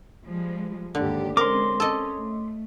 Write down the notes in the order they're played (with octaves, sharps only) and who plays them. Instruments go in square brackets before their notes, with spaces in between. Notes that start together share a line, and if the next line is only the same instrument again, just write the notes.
[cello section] F3 G3 G#3
[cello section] D#2 G#2 G4 [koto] D3
[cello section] G#3 C4 C#4 [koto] A#4 [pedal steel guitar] C6 D6
[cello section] C#4 [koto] A4 D#5
[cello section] A3